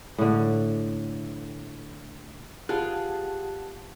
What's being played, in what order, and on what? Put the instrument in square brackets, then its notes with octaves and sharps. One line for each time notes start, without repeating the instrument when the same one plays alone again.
[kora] A2 D3
[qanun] F4 B4 [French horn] G4 [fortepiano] G#4 [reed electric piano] F#5 A5 F#6